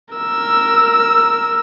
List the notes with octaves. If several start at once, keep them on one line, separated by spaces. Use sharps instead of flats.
A#4 E6